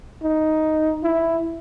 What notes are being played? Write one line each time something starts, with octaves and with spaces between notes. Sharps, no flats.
D#4
E4